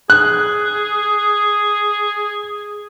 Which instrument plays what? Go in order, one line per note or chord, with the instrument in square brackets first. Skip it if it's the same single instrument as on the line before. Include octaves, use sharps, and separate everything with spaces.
[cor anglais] G#4 [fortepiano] F#6